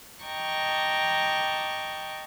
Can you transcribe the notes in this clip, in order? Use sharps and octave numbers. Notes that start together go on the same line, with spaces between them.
D#5 G5 A5 A#5 C#6 D6